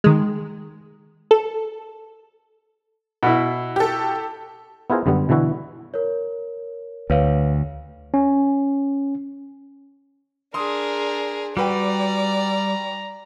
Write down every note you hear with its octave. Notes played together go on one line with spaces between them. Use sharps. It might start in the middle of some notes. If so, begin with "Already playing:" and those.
D#3 G#3
A4
B2 E4
G4 A4
B3 E4 F4 G#4 A#4 C5
F#2 D3 G3 B3
B2 D3 E3 E4 F#4
A#4 C#5
D2 B4 C#5 F5
C#4
D4 G#4 A#4 C6 D#6
G3 F#4 B4 D5 G5 A#5